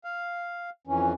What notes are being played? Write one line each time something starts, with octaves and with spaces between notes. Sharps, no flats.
F5
F2 E3 C#4